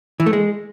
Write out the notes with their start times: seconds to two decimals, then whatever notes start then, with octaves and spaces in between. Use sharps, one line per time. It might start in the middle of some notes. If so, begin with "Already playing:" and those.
0.20 E3
0.26 A3
0.33 G#3